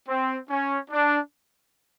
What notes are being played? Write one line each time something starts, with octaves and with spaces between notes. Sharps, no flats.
C4
C#4
D4